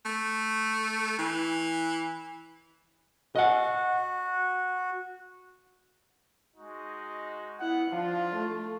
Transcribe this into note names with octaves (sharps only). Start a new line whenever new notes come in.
A3
E3
F#4 D#5 F#5
G#3 D#4 F#4
B3 E4 F#5
F3 D4 F4
A3